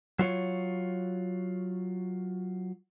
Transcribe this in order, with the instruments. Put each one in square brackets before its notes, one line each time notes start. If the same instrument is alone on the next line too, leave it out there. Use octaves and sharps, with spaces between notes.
[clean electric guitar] F#3 F4 C#5